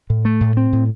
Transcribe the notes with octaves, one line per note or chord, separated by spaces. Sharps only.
A2
A3
A2
C4
A2